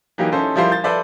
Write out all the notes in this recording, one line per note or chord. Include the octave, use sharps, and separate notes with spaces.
E3 F#3 A#3 D#4 G4
C#4 D#4 E4 A4 C5
F3 G3 E4 F4 A#4 C5
G6 A6
A4 B4 C5 D5 E5